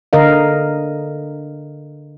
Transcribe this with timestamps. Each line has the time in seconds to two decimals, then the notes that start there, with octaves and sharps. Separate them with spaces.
0.13 D3 A#4 D#5 F5